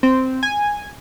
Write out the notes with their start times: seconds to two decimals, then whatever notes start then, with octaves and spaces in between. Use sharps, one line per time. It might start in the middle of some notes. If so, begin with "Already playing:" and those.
0.03 C4
0.43 G#5